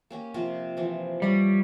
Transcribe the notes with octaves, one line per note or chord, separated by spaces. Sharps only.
A#3 C#4 G4
C3 F3 C4
E3 F3
G3 C#5 D5